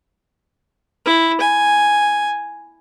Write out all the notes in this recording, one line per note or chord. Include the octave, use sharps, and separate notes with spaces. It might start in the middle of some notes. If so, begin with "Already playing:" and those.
E4
G#5